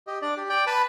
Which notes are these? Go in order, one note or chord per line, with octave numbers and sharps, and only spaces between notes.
G4 D#5
D4 D5
G4
D5 G5
B4 A5 B5